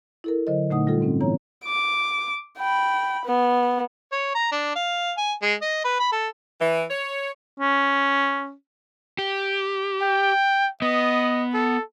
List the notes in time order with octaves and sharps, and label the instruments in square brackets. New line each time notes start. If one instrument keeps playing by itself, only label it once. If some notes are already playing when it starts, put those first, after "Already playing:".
[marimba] E4 A4 A#4
D3 F#3 C5 D#5
A#2 D3 A3 D#4 F#5 D#6
G3 F4 A4
G#2 C4 C#4
E3 B3 E4 C#5 A#5
[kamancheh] D6
G5 B5
B3
[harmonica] C#5
A#5
D4
F5
G#5
G#3
D#5
B4
B5
A4
[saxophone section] E3
C#5
[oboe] C#4
[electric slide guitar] G4
[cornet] G5
[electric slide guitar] B3 [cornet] D#5
[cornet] A4